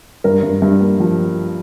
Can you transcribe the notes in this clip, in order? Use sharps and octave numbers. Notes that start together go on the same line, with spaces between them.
G2 A#4
G2
G2
A#3
F3